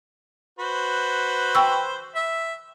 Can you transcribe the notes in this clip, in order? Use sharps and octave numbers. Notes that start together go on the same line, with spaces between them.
F#4 B4 C5
G5 C#6 E6
E5